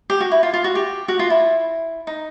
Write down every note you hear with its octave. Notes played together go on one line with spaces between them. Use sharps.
G4
F#4
E4
F4
F4
F#4
G4
F#4
F4
E4
D#4